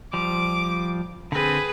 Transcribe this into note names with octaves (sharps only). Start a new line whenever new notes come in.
F3 G3 D6
D3 C4 G#4 B4